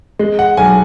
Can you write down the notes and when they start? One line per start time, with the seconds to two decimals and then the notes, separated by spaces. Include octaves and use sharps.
0.19 G#3
0.39 F#5
0.57 B1 G#5